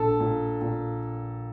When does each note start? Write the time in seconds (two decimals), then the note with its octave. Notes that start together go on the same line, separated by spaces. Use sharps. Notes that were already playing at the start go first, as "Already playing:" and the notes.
Already playing: A#1 A4 A5
0.20 A#2
0.62 A#2